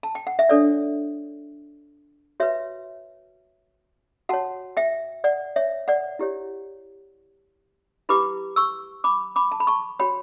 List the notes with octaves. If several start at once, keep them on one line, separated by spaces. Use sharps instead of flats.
A5
G5
F#5
E5
D4 A4 C#5 D5
F#4 B4 C#5 E5
F#4 C#5 F#5 A5
E5 G5
D5 F#5
C#5 E5
D5 F#5
E4 G4 C#5
E4 G4 B4 B5 D6
C#6 E6
B5 D6
B5 D6
A5
B5
A5 C#6
F#4 C#5 G5 B5